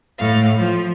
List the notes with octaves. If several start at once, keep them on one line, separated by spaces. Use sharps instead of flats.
A2 F5
F3